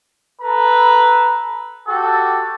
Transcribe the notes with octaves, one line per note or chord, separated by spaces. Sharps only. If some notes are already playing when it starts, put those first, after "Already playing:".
A4 B4 A#5
F#4 G4 A4